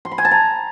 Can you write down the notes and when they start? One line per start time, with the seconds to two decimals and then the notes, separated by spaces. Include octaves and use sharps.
0.05 C6
0.12 B5
0.18 G#5
0.25 A5
0.31 A#5